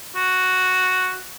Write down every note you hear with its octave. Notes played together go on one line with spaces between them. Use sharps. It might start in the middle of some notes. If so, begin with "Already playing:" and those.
F#4